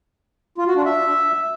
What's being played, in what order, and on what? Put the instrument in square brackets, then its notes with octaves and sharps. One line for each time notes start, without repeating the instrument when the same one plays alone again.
[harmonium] F4
F#4
D4
E5